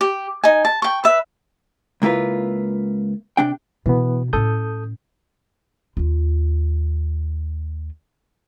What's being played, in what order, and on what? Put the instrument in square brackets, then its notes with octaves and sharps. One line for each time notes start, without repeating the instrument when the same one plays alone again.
[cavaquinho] G4
D#4 G#5
A5
G5 C#6
B4 E5
[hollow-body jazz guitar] C#2 A#3 E4 F4 B4
C3 D4 G5
[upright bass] B2 [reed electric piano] E3 B3
[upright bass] A2 C#4 [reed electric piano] A4 D#6 G6
[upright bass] D#2 F4